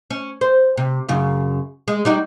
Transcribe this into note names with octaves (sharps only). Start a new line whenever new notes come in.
C#4
C5
C3
F#2 C#3 F4
G#3
G3 D#4 F#4